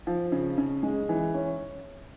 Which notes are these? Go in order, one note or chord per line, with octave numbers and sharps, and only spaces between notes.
F3
C#3
C#3
G#3
E3
C#4